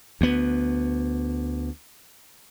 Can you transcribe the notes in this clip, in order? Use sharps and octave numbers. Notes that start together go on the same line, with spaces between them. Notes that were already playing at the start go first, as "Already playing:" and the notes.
D2 B3